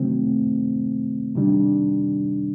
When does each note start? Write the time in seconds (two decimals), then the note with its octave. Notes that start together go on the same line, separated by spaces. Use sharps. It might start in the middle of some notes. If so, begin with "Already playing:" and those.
Already playing: C3 D#3 F#3 A3 C4
1.36 C3 D#3 G3 D4